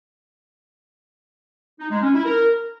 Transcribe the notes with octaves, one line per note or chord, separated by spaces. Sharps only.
D#4
G#3
C#4
E4
A#4